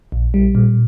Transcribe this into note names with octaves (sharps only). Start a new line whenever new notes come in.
A#1
G3
A#2